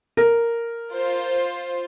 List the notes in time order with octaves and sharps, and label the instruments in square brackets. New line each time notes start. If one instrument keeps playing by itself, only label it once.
[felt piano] A#4
[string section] F4 C5